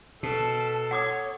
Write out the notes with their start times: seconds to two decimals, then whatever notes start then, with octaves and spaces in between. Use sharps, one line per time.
0.23 B2 A4 A5
0.91 C#5 F#5 D6 D#6